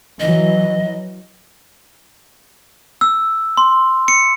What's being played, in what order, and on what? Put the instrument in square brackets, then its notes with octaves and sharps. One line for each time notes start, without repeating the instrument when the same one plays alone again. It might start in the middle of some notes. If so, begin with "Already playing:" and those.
[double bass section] E3 F#3 [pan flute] D#5
[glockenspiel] E6
C6
C#7